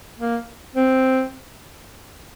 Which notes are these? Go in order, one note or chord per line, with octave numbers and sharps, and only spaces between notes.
A#3
C4